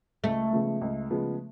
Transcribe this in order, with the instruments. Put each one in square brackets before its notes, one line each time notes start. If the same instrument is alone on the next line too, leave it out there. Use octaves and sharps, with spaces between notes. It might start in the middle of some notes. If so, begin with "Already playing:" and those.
[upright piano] C#2 [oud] A3
[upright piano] C#3 F3 G#3 B3
C#2
C#3 F3 G#3 B3